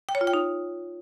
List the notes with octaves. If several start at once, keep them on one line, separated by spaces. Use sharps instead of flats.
G5
C#5
F4
G5
D#4